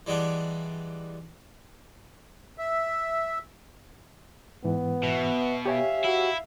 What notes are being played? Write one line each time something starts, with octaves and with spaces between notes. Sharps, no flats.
E3 G3 G#3 B3 D4
E5
G#2 E3 B3
B2 E5
G4 C#5 E5 F5 G#5
E4 F#4